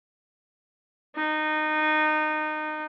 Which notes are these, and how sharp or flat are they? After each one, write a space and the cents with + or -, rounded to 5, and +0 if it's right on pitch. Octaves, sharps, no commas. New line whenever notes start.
D#4 -20